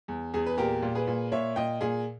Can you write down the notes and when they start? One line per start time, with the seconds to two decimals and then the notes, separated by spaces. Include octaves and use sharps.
0.08 E2
0.34 E2 G#4
0.46 B4
0.57 A#2 G4 A#4
0.82 A#2
0.95 G#4 B4
1.07 A#2
1.32 A#2 C#5 E5
1.56 A#2 D#5 G5
1.81 A#2 G#4